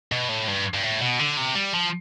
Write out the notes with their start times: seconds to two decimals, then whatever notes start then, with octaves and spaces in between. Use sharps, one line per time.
0.12 B2
0.29 A2
0.48 G2
0.74 G2
0.83 A2
1.01 B2
1.19 D3
1.37 C3
1.55 G3
1.73 F3